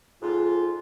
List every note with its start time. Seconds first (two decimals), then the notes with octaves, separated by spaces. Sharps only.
0.22 F2 G#2 F4